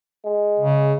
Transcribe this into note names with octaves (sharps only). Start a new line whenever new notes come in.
G#3
C#3